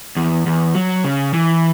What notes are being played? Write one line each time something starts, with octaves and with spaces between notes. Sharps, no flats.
E2
E2
F#3
C#3
E3